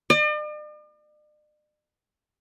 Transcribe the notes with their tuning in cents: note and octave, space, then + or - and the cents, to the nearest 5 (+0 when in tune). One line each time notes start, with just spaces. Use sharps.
D5 +45